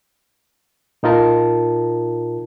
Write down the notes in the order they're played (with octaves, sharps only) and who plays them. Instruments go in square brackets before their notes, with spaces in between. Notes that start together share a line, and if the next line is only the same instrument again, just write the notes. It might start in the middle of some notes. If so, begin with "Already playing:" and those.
[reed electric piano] A#2 D#4 F4 A#4 A5